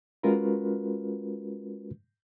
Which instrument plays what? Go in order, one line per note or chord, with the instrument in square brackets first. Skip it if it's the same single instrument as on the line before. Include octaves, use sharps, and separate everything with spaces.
[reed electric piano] G#3 C#4 F4 F#4 A#4 B4